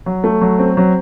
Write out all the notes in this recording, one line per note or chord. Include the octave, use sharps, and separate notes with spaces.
F#3
A3
F#3
C4
F#3